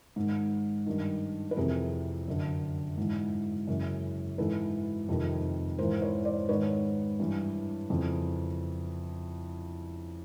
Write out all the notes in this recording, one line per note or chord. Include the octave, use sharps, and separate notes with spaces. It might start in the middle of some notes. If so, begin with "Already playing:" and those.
G#2 D#3
G2 D#3
B4
F2 C3 E3 G#4 A#4
F#2 D3
G#2 E3
F#2 C#3 E3
G#2 E3 A4 B4
F2 C3 D#3
G#2 E3 A#4 C5
C5
B4 C#5
C5 D5
G#2 D#3 B4 C#5
G2 E3
F2 C#3 E3